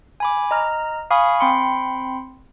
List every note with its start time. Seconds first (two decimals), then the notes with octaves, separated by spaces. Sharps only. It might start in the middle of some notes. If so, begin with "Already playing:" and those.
0.20 G#5 B5 D6
0.51 D#5 A#5 F6
1.11 F5 G#5 B5 C#6 D#6 F6
1.40 C4 G5 B5 C6 C#7